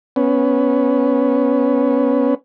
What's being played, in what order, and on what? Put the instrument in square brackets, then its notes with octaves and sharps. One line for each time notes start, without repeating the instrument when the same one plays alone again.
[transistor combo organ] B3 C#4